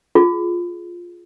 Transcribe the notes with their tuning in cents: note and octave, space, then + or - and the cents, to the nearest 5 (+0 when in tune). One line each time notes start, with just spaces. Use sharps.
F4 +0 G#4 +15